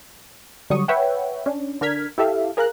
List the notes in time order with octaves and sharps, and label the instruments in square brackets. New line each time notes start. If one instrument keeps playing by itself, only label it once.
[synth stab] D3 F#3 G3 C#6 D#6
B4 C#5 E5 F#5 G5
C#4 D4
D3 D4 A#4 F6 G#6 B6
E4 G4 A4 E5 F5
G#4 A#4 F5 A#5 F#6